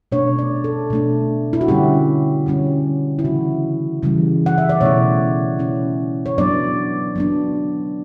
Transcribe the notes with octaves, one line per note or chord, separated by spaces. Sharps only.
B2 A3 D4 C#5
D5
A4
B2 A3 D4
E4
F#4
D3 G3 C#4 G4
D3 G3 C#4
E4
C#3 E3 G3 F#4
C#3 E3 G3
F#5
E5
D5
B2 A3 C#4 E4 C#5
B2 A3 C#4 E4
C#5
F#3 B3 D4 D5
F#3 B3 D4